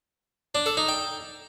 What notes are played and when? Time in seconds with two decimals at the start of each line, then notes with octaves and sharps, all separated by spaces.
0.55 D4
0.66 A4
0.77 D#4
0.89 G5